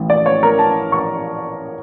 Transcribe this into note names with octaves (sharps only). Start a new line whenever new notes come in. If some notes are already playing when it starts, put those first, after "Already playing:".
Already playing: A1 A2 E3
D5
C#5
A#4
A5
C#6